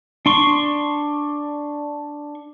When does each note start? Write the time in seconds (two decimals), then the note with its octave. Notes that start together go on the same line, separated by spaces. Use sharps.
0.26 D4 C6 C#6